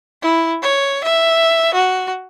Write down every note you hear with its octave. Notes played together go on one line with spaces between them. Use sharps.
E4
C#5
E5
F#4